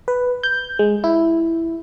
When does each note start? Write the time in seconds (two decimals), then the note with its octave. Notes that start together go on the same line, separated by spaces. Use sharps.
0.08 B4
0.43 G6
0.79 G#3
1.04 E4